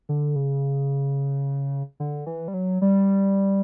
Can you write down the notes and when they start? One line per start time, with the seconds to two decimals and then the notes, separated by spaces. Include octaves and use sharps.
0.09 D3
0.36 C#3
2.00 D3
2.26 E3
2.48 G3
2.54 F#3
2.82 G3